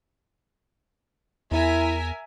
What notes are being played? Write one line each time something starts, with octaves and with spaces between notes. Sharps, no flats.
E2 E4 A#4 E5 G#5